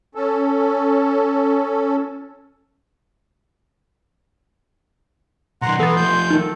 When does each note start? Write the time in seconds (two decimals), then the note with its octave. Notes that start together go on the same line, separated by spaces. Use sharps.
0.15 C#4 A4
5.62 B1 D#3 F#5 A#5 C6
5.80 E3 B3 A4 A6
5.97 F3 A3 G6
6.30 D#3 D#4 A4